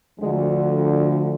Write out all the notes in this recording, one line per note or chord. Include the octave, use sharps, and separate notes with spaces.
D2 D3 F3 G#3